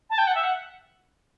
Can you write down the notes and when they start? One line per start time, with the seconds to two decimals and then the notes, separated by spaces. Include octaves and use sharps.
0.10 A5
0.18 G5
0.27 F#5
0.35 E5
0.44 F#5